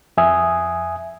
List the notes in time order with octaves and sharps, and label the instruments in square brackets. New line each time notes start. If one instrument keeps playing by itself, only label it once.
[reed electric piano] F2 E5 G#5 D#6